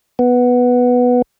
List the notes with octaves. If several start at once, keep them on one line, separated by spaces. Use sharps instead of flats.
B3